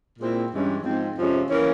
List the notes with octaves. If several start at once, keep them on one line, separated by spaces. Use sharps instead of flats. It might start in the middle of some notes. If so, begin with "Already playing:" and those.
A#2 G#3 C4 E4
G2 E3 G#3 C#4
G#2 F3 G#3 C4
F2 C3 F3 G#3 C#4
E3 A#3 C#4